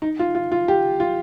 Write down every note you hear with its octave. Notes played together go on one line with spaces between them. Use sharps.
D#4
F4
F4
F4
G4
F4